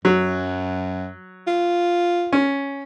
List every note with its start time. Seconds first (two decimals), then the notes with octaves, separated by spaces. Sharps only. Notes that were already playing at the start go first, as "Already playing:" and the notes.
0.05 F#2 F#3
1.47 F4
2.33 C#4